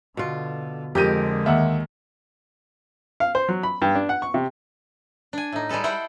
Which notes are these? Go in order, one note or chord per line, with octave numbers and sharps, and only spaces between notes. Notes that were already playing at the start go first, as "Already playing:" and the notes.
B2 D3 F4
F2 D3 G#3 G4 A#4 G6 D#7
D#2 E5 F#5
F5
C5
F#3
B5
G2
D4
F#5
C#6
C3
D4 G#5
A2 D#4
G3 G#3 G#4 A4 B4
E4 C5 F#5 G5